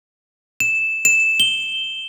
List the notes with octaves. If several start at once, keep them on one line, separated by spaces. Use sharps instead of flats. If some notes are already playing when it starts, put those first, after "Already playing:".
E7
E7
G7